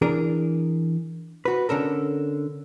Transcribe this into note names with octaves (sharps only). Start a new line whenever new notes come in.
E3 D4 G#4 A#4
F#4 B4
D3 C#4 A4 A#4